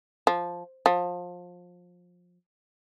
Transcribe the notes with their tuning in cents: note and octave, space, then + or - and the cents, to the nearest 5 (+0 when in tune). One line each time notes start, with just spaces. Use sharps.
F3 +0
F3 +25